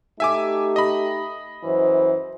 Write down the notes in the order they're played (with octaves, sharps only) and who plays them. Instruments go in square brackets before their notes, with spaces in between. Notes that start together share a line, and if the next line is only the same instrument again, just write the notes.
[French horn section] A3 D#4 G4 [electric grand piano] E5 G#5 D6
[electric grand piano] D#5 B5
[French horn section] F#2 E3 C5